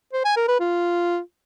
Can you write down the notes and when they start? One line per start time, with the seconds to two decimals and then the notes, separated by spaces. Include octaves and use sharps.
0.13 C5
0.25 G#5
0.36 A#4
0.48 B4
0.60 F4